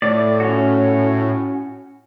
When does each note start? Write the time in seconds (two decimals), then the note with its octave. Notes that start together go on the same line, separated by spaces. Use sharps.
0.02 A2 D5
0.40 C#4 F#4